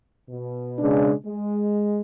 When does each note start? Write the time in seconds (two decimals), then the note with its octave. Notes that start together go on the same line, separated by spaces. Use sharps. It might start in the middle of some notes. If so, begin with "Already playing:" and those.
0.30 B2
0.77 C#3 G#3 D4
1.26 G#3